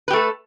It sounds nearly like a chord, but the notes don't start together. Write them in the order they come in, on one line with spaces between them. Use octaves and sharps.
B4 G4 A3 A4